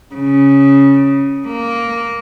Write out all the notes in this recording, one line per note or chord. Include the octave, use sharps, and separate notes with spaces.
C#3
A#3